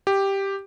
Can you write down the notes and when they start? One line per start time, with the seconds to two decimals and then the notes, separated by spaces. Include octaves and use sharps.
0.07 G4